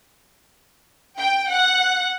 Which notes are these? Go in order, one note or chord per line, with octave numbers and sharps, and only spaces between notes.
G5
F#5